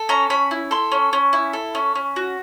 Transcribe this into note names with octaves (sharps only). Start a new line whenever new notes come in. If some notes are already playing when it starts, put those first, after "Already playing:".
Already playing: A4
C#4 A#5
C#4 B5
E4
A4 C6
C#4
C#4
E4
A4
C#4
C#4
F#4